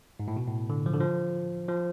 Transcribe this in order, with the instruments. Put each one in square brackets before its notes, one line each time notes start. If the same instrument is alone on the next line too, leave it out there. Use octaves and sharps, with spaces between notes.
[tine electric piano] G#2
A2
B2
A2
D3
F3
D3
F3
F3